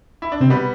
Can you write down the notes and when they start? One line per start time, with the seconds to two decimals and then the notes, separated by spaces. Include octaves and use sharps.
0.22 E4
0.32 D4
0.41 C3 C4
0.50 B2 G3 B3